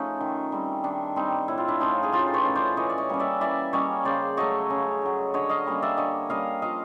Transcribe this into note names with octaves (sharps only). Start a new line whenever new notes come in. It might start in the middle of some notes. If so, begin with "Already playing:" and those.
Already playing: F3 A3 C#4 D#4
D#3
G3 C4
D#3 D4
G3 C4 D#4
A2 E4
F4
D4 E4
F3 A3 C#4 D#4 F4
G#4
A2 F4 G4
C5
B4 C#5
F3 A3 C#4
C5 D5
E3 C#5 D#5
D5
C#5 D#5
G3 A#3 C#4
D5 E5
E3 D5 E5
G3 A#3 C#4 C#5 D#5
C#3 C5 D5
F#3 A3 C#5 D#5
C#3
F#3 A3
D3 C#5 D#5
D#5 F5
G3 A#3 C#4
D5 E5
D3 C#5 D#5
G3 A#3 C#4 D#5 F5
F3 D#5 F5